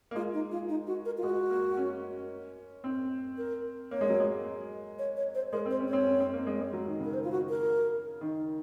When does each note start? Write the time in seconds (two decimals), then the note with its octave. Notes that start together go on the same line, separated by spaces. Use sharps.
0.11 A#3
0.15 G#3 F4
0.34 D#4
0.51 F4
0.69 D#4
0.87 F#4
1.05 A#4
1.18 F4
1.23 G#3 F#4
1.50 A#3
1.77 C#4
2.84 C4
3.38 A#4
3.91 A#3 C#5
4.01 G#3
4.10 F#3
4.20 G#3
4.99 C#5
5.17 C#5
5.35 C5
5.53 G#3 A#4
5.66 C4 C5
5.80 C#4
5.88 C4 C#5
6.07 C#4
6.20 C4
6.33 A#3
6.47 G#3
6.60 G#3
6.73 F#3
6.87 D#3
7.00 C#3 A#4
7.14 C5
7.24 F4
7.32 F#4
7.49 A#4
8.21 D#3